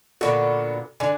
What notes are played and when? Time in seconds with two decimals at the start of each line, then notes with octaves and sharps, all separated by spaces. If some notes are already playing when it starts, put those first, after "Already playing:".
0.21 A#2 D3 B3 F#4 A4
1.00 D3 D4 G#5